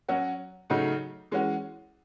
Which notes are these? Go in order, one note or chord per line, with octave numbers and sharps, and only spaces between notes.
F#3 C#4 F#4
C#3 F#3 A3 D#4 F#4
E3 G#3 C#4 F#4